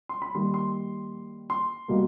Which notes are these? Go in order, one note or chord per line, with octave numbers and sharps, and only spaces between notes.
C6
B5
D#3 G3 A#3 C6
C6
C6
B2 G3 A#3